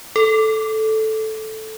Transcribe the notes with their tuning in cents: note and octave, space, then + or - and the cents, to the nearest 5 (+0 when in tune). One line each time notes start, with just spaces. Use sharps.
A4 -5